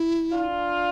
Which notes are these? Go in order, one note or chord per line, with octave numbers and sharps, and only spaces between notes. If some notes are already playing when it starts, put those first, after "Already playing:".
Already playing: E4
D4 F4